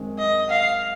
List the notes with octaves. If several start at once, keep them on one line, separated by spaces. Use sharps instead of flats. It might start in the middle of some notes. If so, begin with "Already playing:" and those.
Already playing: F#2 D#3 G#3 C4
D#5
F5